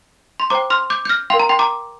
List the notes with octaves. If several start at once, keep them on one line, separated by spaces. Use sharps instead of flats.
C6
C5 G5 A#5 D6
C6 F6
D6 G6
G6
F6 A#6
A#4 F5 G5 C6
A#5
G5 C6
A#5 D6